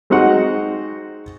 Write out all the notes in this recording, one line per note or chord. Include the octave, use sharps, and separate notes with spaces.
G#3 C4 D#4 F#4 F#5